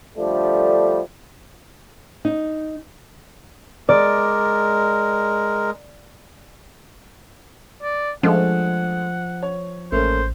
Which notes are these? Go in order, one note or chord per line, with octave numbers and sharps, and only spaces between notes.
D3 F3 G3 A3 D4
D#4
G#3 A#4 D5
D5
F3 G#3 A3 D4 F#5
C#5
A1 A3 A#3 C#4 C5